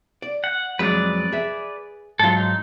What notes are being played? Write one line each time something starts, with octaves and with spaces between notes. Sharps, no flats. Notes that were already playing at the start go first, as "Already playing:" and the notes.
D5
F#5
F2 F#3 G#3 B4 D5
G#4 E5
G#2 F#3 F4 A4
D#4